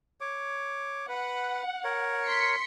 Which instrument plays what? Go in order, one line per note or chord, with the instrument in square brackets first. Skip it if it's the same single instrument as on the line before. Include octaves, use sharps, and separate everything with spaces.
[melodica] C#5 D6
[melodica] B4 [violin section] F#5
[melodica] A#4 C#5
[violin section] C6 B6 C#7